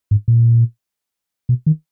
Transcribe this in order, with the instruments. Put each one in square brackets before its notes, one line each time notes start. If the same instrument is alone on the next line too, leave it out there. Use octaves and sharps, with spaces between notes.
[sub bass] G#2
A#2
B2
D#3